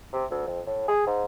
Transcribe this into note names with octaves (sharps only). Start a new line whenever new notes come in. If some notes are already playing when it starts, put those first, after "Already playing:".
C3
D2
F2
A2
G#4
G#2